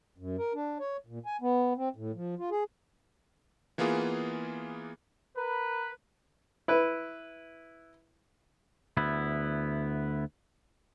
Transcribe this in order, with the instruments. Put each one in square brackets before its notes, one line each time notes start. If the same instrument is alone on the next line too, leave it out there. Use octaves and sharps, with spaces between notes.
[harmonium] F#2
A#4
D4
C#5
A#2
G#5
B3
C4
A2
F3
F4
G#4
[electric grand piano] E3 A#3 B3 F4 G#4
[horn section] A#4 B4
[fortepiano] E4 B4
[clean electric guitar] D2 B3 E4